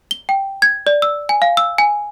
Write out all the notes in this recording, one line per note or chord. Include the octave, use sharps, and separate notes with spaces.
G7
G5
G#6
D5
E6
G#5
F5
E6
G#5